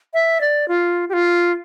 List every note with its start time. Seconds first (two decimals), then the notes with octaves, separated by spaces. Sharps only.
0.14 E5
0.41 D5
0.68 F4
1.09 G4
1.13 F4